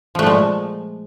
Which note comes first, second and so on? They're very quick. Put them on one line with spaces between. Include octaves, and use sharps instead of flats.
F3 A3 A#2 G#3